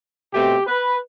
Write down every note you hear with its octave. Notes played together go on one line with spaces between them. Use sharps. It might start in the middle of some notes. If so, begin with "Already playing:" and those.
B2 A3 C4 G4
B4